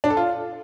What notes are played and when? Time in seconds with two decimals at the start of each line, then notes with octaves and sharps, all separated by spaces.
0.04 D4
0.10 A4
0.17 F4